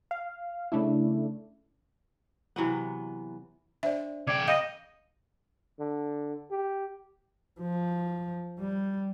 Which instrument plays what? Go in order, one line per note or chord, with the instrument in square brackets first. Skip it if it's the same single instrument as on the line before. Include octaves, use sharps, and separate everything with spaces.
[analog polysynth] F5
C#3 A3 D4 E4
[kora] C3 E3 F#3 B3
[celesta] D4 C5 D5 [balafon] E5
[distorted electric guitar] C#3 G5 [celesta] D5 D6 G#6
[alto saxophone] D#5 [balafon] F5 [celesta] G6 A#6 D#7
[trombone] D3
G4
[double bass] F3
G3